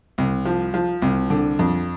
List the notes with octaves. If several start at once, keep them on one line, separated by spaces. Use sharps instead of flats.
C2
F3
F3
C2
D3
F2